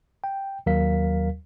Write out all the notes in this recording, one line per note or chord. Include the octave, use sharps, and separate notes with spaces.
G5
D#2 F#3 A#4 F5 B6